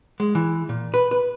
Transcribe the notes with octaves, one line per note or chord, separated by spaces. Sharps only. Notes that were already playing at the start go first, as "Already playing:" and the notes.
G#3
E3
A#2
B4
B4